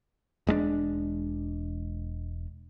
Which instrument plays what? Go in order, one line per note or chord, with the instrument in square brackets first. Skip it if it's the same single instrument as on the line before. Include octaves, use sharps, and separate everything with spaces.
[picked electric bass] E1 G#3 A3 D4